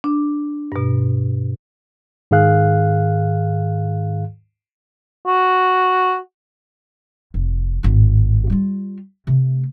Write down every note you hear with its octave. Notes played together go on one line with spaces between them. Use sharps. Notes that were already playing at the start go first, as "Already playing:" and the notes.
D4
G2 B2
G#2 D#3 G#4 F5 F#6
F#4
F1
G#1 A2
G3 F4
C3 A3